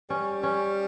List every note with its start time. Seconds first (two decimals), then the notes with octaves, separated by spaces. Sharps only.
0.10 G3 C#4
0.43 C#4